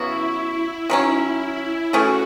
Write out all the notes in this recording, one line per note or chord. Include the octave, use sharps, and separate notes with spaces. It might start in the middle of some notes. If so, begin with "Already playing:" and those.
Already playing: C#3 F#3 B3 E4 F#4
D#3 F#3 C#4 E4
E3 A3 C#4 F#4 G#4